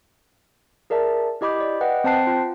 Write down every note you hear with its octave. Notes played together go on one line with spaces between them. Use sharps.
G#4 A#4 D5 E5 A5
E4 G4 D#5 B5 D6 G6
D5
B4 D#5 F#5 G5
C4 C5 G5 A5 F#6 C7
F4